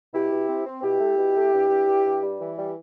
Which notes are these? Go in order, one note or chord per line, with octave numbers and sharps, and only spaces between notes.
B2 E4 G4
B2
C4
C4
B2 E4 G4
A3
B2
A3
G2
G2
G2
G2
G3
E3
G3